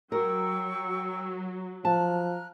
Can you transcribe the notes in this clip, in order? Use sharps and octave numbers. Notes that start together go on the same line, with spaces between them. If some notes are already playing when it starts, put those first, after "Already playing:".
F#3 A#4 G5 C#6 E6
F3 A5 A#5 F6 F#6